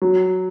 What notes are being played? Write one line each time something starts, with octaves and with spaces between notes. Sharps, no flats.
F#3